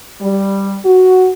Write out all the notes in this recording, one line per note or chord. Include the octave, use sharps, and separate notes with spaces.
G3
F#4